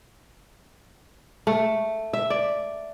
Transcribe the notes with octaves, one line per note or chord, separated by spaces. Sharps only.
A3
E5
D5